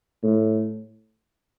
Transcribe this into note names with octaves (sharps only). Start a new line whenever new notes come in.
A2